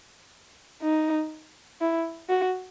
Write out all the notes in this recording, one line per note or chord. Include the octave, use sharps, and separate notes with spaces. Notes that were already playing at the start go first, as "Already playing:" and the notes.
D#4
E4
F#4